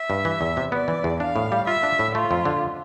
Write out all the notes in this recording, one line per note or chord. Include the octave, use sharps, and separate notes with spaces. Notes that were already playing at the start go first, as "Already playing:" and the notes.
Already playing: E5
G2
E3
E2
C3
B3 D5
E3
E2
D4 F5
A2
G3
F4 E5
D4
A2
A3 F4
F2
D3